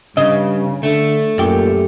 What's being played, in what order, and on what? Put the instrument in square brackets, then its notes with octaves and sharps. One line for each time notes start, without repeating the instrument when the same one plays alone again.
[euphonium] G2 [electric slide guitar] C#3 [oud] D#5
[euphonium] D3 [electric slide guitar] A3
[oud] F#2 G4 [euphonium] A#2